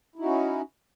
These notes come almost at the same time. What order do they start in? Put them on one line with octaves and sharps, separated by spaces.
E4 D#4 F#4 C#4